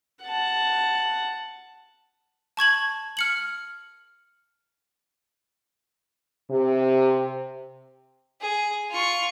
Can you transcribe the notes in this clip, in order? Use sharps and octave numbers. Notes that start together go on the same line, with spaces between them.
F#5 A5
A5 C#6 G#6 F#7
F6 C#7 F#7
C3
G#4
F4 C#6